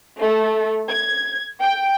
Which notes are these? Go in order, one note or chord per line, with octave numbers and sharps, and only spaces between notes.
A3
G#6
G5